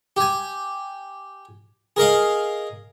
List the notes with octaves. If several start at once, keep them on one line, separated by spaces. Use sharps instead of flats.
G4 G#5
G#4 A#4 D#5 F5